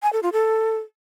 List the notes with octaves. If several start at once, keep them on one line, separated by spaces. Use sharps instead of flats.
G#5
A4
F4
A4